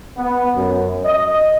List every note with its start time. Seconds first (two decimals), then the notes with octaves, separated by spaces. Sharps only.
0.17 B3
0.56 F#2
1.05 D#5